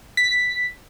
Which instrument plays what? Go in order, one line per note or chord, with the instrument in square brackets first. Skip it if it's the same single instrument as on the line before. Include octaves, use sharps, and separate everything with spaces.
[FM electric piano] B6